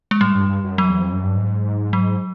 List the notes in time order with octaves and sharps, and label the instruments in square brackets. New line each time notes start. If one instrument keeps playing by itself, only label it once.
[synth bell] G#3
[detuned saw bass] A2 [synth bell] G3
[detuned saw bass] G2
G2
F#2
[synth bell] F#3
[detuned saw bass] E2
F2
F#2
G2
G#2
[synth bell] F#3